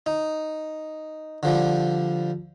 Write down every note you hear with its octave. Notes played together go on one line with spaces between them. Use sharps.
D#4
D3 F3 G3